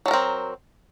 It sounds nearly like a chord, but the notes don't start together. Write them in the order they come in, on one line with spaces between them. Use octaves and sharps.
F#3 A4 A#4 C4